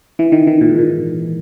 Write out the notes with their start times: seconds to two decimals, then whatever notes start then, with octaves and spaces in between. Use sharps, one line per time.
0.19 E3
0.32 D#3
0.47 D#3
0.61 A#2
0.70 G#2
0.78 A#2